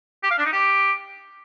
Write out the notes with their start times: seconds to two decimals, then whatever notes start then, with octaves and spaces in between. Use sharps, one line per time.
0.23 G4
0.31 F5
0.38 D4
0.45 D#4
0.52 G4